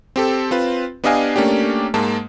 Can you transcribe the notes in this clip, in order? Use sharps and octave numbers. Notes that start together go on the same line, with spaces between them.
C4 G4 A4
C4 F4 B4
B3 D4 G4 D#5 F5 G#5
A3 A#3 C#4 D4 G4
G#2 G#3 A#3 A5